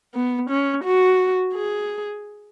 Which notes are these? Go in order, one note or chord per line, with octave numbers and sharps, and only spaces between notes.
B3
C#4
F#4
G#4